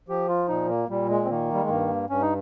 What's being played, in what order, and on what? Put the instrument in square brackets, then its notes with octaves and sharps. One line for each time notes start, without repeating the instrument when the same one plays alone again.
[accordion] F3 G4
F4
A#2 D#4
A#3
A#2 G3
G#3
C4
D#3 A#3
G3
G#3
G2 A#3
G2 C#4
D#4